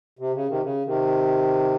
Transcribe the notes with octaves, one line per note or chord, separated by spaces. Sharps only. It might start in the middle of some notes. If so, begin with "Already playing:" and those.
C3
C#3
C3 D#3
C#3
C3 D#3